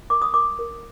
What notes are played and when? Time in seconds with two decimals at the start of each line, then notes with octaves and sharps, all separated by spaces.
0.10 A#4 D6
0.22 D#6
0.34 A#4 D6
0.59 A#4